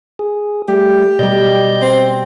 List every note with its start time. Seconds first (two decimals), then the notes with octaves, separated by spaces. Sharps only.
0.19 G#4
0.68 G3 A3 G4
1.19 B2 G3 D5 D#5 G6
1.82 C4